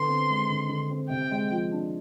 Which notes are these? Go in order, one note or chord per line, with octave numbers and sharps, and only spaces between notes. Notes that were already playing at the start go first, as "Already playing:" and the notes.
Already playing: D3 B3 C6
C4
G#3
D3
D3
C4
C3 G5
G#3
F3
D4